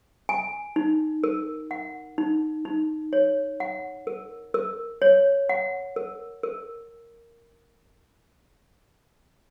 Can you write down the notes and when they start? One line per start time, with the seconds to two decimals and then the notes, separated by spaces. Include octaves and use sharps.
0.29 G#5
0.76 D#4
1.24 A#4
1.71 F#5
2.18 D#4
2.65 D#4
3.13 C#5
3.60 F#5
4.07 A#4
4.54 A#4
5.02 C#5
5.49 F#5
5.96 A#4
6.43 A#4